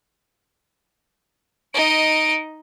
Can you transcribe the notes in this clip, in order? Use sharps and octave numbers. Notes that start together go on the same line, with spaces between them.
D#4 D#5 D7